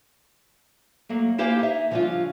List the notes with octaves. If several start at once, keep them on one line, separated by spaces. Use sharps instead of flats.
F#3 A3 A#3
A#3 E4 G4 C5 F5 G#5
D#4 E5
C#3 F3 G3 C#4 D4 F4